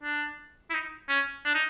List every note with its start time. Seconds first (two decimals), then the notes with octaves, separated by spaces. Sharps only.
0.03 D4
0.70 E4
0.74 D#4
1.09 C#4
1.45 D4
1.54 D#4